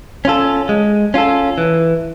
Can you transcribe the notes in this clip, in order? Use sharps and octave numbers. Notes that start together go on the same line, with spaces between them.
C#4 F4 A4
G#3
C#4 F4 A4
E3